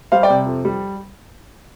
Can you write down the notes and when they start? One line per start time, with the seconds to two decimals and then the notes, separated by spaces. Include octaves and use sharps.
0.12 G3 C5 F5
0.23 D5 G5
0.30 C3
0.46 F2
0.65 G3